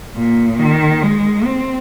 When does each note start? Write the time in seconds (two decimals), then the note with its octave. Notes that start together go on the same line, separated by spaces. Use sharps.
0.16 A#2
0.59 D#3
1.03 G#3
1.45 C4